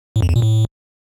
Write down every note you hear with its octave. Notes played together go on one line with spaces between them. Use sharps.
A2
F2
E2
A#2
A2